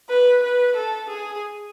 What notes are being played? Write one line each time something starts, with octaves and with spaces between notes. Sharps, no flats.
B4
B4
A4
G#4